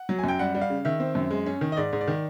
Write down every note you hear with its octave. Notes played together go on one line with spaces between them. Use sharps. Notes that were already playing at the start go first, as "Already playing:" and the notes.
Already playing: F#5
F#3
G#5
F#2 G5
G3 F#5
G3
F5
C#3
D#3 E5
C4
F#2
G#3
C#4
D#3
D#5
G#2 D5
G#2
D5
D#3